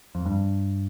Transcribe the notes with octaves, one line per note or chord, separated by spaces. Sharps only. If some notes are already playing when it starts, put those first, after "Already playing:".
F2
G2